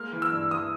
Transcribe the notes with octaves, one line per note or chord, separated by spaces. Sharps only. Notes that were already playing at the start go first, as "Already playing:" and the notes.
Already playing: G#3 A#3 F6
E3
E6
G2
E3 D#6